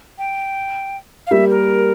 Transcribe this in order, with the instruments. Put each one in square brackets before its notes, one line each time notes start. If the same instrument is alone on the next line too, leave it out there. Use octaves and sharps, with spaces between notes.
[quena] G5
F5
[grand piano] G3 A#3 [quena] E5
[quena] A#4